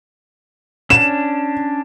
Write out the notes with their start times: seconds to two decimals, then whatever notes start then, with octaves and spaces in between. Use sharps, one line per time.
0.90 C#4 D4 E7